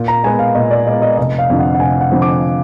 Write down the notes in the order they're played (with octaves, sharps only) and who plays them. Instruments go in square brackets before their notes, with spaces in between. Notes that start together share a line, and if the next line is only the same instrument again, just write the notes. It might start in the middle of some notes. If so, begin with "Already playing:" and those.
Already playing: [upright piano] A#2
[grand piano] A#5
[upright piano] G#3 B3 [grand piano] G#5
[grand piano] F5
[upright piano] A#2 [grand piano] D#5
[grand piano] D5
[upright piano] G#3 [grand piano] D#5
[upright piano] B3
[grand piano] D#5
[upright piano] F1 [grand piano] D#5
[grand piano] F5
[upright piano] F2 D3 F3
[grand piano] F#5
F#5
[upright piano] F1 [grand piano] G#5
[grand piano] F#5
[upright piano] F2 D3 F3
[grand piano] D6